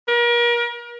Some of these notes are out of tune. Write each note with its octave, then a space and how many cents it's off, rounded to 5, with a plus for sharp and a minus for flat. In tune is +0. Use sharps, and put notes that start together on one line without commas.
A#4 +35